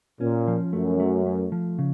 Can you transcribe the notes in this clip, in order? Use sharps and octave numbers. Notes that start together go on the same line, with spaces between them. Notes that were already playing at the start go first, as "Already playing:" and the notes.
A#2 C#4
F3
F#2 A3
A3
A3
F3
C#3